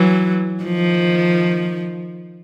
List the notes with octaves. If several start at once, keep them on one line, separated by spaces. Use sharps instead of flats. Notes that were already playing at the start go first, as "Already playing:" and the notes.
Already playing: E3 F#3
D#3 F3